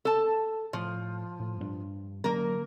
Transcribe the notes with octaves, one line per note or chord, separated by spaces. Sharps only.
A4 A5
A2 F3
A2
G2 B3 D4
D3 F#3 A#3 C#4 A#4